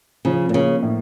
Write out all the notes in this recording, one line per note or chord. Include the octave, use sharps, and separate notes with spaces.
C#3 F3
A#2
C#3 A#3
A2